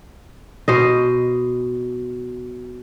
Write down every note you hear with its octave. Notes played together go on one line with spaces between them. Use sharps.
B2 C5 D#5